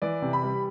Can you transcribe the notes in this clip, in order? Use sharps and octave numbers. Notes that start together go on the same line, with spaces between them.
E3 D5
C3
B5
G3